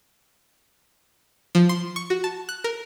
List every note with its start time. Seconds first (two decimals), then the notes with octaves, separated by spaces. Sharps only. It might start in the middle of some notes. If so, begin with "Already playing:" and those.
1.55 F3
1.69 C6
1.96 C#6
2.10 F#4
2.24 A5
2.49 F#6
2.64 A#4